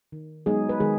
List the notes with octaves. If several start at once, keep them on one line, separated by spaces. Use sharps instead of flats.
D#3
F#3 G#3 B3 D#4 G#4
B4
D#3 G#3 G#4